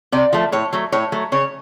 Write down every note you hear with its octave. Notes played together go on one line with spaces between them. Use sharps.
C3 D5
F3 A3
A2 C#5
F#3 A3
A2 C#5
F#3 A3
C#3 C#5